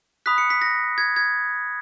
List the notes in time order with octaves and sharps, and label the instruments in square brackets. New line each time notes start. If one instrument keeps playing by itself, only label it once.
[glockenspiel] B5 D#6 F#6 B6
C#7
B6
A#6
G#6
G#6